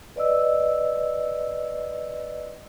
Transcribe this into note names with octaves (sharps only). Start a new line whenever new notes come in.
B4 D5 D#5 E6